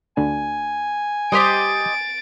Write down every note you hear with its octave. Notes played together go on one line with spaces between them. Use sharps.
D2 D3 G#5
G3 G4 C5 D#5 A6 D7